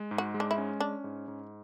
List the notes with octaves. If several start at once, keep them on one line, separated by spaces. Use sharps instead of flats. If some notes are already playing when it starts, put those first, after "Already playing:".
Already playing: G#3
G#2
F#4
G#3
D4
E4
C#4
C#4 D4
G#2
G#2